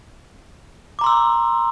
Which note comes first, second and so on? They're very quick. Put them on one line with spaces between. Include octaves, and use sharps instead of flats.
D6 A#5 C6 E6